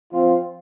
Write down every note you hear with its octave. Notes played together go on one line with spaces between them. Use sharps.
F3 C4 F4